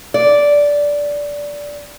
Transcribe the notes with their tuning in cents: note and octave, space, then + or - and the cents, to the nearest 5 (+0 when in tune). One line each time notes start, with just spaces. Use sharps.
D5 -10